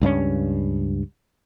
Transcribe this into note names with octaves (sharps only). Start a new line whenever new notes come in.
C#2 G2 F#3 C#4